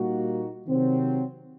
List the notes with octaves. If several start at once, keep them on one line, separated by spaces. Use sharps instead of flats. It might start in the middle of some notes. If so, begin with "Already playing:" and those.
Already playing: A#2 G3 A#3 D#4 F#4
C3 D#3 F#3 C4